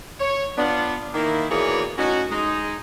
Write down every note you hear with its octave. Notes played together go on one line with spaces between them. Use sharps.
C#5
B3 D4 F4
D#3 A#3 E4
B2 E3 A#3 G#4 C#5 D5
A2 C#4 D#4 F#4
G#3 D#4